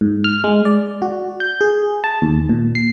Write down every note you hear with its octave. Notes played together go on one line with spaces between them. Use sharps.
G#2
F6
G#3
D5
F#4
G6
G#4
A5
D#2
A#2
C7